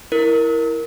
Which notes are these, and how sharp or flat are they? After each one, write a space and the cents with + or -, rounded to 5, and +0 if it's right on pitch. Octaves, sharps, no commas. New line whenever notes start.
E4 +0 A#4 +0